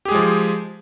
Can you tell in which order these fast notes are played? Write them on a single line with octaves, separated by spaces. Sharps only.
G4 G#4 G#3 F3